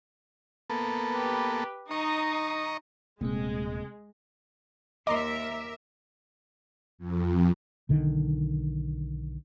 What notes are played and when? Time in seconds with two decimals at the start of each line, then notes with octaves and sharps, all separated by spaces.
0.70 A#3 B3 A4
1.09 G4 B4
1.91 D#4 D#5 A#5 C#6 D#6
3.21 D#1 C3 G#3 A3 C4
5.07 D#2 A#4 D#5 E5 A#5 C6 D6
6.98 F2
7.89 B1 D3 D#3